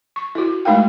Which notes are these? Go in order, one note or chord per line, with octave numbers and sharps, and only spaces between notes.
C#6
E4 F#4
G#3 A3 D#4 A#4 F5 G5